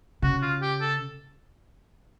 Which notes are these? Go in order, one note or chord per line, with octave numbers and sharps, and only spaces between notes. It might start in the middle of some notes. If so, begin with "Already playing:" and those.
C#3 F#4
F4
G4
A4